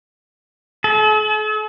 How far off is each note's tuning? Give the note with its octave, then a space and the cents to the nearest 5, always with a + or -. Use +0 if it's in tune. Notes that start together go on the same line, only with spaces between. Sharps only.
A4 -45